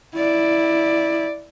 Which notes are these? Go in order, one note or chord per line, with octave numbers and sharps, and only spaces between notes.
E4 D5